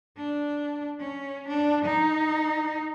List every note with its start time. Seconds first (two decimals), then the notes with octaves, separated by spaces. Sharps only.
0.17 D4
1.00 C#4
1.48 D4
1.85 D#4